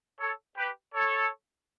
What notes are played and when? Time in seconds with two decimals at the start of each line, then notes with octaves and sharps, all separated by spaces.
0.19 A4 C#5
0.56 G4 B4
0.94 A4 C#5